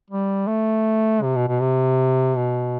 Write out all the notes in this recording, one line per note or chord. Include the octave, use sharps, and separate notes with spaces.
G3
A3
C3
B2
B2
C3
B2